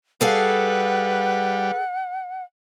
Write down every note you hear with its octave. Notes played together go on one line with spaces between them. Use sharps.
G3 G#4 A4 B4 F5 F#5